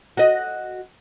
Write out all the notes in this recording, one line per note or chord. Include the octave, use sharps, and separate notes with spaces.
F#4 D#5